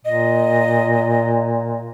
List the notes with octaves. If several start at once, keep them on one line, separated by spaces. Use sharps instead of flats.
A#2 D#5